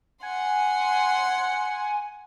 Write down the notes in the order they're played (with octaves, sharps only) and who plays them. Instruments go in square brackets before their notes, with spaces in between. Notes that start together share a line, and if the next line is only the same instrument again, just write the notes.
[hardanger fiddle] F#5 C6 [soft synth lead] G#5